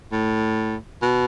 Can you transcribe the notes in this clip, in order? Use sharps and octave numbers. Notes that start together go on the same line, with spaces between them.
A2
B2